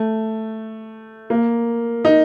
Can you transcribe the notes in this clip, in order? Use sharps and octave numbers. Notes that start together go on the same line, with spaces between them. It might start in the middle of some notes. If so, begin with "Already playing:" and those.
Already playing: A3
A#3
D#4